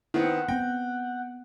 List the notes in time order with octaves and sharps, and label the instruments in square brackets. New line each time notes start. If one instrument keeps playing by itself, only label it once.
[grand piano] D#3 B3 C4 [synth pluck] E4 [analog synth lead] F#5
[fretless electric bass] B3 C4 [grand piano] G5 [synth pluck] A#6